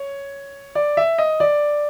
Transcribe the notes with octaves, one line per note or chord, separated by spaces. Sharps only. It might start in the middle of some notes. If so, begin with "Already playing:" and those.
Already playing: C#5
D5
E5
D#5
D5